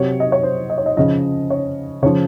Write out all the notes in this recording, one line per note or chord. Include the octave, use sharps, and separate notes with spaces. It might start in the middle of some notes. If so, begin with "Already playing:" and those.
Already playing: C3 F#3 C#5
D#5
C#5
C5
D#5
C#5
D#5
C#3 F3 D#5
C#5
C#3 F3 C#5